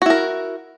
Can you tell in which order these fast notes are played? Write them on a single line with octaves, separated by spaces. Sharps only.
F#4 E4 A#4